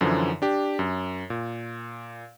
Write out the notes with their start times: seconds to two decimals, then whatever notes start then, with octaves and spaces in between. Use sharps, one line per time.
0.01 F#2 D3 E3 F3
0.42 D4 G4
0.79 F#2
1.30 A#2